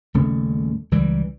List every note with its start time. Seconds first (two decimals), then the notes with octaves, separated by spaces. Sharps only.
0.14 D#1 C#3 A3 C#4
0.91 C#2 E3 G3